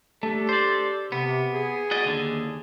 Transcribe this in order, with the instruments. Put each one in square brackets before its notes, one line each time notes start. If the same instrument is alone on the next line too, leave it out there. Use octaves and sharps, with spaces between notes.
[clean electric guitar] A3 [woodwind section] D4 G4 A4
[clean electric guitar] C5 D5
[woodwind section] C3 [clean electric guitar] B3
[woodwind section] G#4
[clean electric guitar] F#4 D5 D#5
D#2 D3